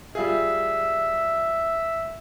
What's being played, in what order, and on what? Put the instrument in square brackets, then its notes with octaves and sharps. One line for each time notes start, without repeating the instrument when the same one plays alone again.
[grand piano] G3 F4 G#4 [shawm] E5